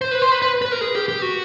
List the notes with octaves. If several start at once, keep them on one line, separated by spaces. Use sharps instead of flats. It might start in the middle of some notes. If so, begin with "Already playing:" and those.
C5
B4
C5
B4
B4
B4
A#4
G#4
G4
G4
F#4